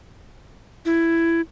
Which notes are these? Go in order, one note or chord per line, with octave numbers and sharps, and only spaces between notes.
E4